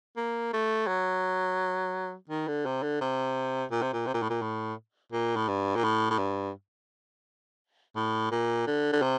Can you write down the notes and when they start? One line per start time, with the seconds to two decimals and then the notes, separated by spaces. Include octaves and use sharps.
0.17 A#3
0.53 A3
0.88 F#3
2.30 D#3
2.48 D3
2.66 C3
2.83 D3
3.01 C3
3.71 A#2
3.82 C3
3.93 A#2
4.07 C3
4.14 A#2
4.23 A2
4.30 A#2
4.42 A2
5.12 A#2
5.36 A2
5.49 G2
5.76 A#2
5.84 A2
6.11 A2
6.19 G2
7.96 A2
8.32 A#2
8.67 D3
8.93 D3
9.02 C3